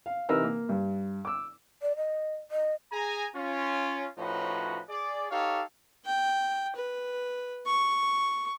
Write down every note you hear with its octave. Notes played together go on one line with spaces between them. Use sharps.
F5
C3 E3 D#4 A#4 B4 E6
A#3
G2
D6 E6
D5
D#5
D#5
G#4 G#5 A#5
C#4 F4
A2 F3 C#4 D#4 F#4 B4
G#4 D5
D#4 G4 A4 C#5 F5
G5
B4
C#6